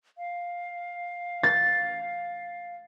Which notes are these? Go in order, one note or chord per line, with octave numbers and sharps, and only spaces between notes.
F5
A6